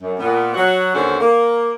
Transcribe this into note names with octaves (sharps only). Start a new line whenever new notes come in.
F#2
A#2 B3
F#3 F#4
D#2 D3 C#4 F#4 C5
A#3